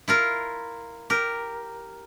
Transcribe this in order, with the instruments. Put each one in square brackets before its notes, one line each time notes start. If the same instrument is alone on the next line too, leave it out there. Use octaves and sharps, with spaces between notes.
[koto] E4 F4 A#4
G4 A#4